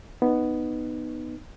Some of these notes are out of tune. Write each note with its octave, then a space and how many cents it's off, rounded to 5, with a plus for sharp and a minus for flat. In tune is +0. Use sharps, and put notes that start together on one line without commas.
B3 +0 D#4 -15